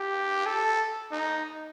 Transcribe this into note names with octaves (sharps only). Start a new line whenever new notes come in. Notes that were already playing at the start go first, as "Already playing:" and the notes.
Already playing: G4
A4
D#4